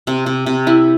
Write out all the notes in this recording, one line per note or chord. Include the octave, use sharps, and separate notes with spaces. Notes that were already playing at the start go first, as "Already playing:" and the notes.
C3
C3
C3
E4